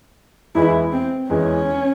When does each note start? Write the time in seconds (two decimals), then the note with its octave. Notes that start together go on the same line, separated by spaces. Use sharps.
0.55 E2 E3 G#3 E4
0.92 C4
1.30 E2 E3 G#3 C#4